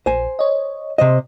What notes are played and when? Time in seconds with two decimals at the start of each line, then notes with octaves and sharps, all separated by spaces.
0.06 A#1 C5 G#5
0.39 C#5 D#5
0.98 C3 C5 D#5